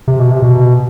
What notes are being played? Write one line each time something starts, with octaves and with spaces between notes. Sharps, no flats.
C3
B2
C3
B2